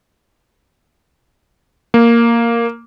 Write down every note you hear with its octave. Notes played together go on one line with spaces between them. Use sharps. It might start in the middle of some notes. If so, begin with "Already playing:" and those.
A#3